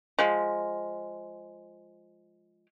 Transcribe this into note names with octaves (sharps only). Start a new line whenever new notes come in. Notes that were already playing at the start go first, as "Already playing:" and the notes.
F3 G#3